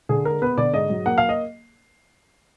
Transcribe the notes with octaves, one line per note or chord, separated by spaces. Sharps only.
D3 G#4
G#3 A#4
B3 B4
D3 D5
G#2 D#5
F#3
A#3 F#5
F5
D#5